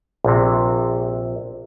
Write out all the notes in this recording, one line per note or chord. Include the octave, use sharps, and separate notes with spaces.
A#1 C3